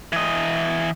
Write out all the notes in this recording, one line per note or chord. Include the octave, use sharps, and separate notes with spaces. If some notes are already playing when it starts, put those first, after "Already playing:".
E3 D#5